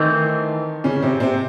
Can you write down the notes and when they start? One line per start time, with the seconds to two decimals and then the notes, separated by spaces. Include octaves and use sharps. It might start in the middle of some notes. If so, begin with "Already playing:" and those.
Already playing: D#3 E3 A3 C4 D#4
0.84 C#3 C#4
1.02 C3 C4
1.20 C3 C4